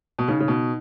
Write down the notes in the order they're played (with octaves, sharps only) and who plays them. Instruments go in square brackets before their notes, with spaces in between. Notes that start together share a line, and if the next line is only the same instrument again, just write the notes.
[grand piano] B2
[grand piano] C#3 [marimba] D#4
[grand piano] C#3
B2